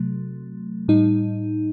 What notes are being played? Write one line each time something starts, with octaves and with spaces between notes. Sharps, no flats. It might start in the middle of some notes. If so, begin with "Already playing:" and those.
Already playing: C3 F#3 A3
A2 G3 D#4